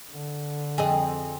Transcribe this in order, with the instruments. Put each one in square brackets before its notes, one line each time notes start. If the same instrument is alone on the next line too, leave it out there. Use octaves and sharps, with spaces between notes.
[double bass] D3
[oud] F2 C4 D#5 [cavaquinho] G#4